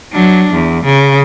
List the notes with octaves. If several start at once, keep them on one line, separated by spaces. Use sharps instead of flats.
F#3 D4
E2
C#3